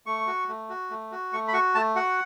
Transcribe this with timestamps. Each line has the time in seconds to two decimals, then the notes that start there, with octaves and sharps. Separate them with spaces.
0.06 A3 C#6
0.27 F#4
0.48 A3
0.70 F#4
0.90 A3
1.12 F#4
1.33 A3 C#6
1.48 B5
1.53 F#4 C#6
1.75 A3 A5
1.95 F#4 F#5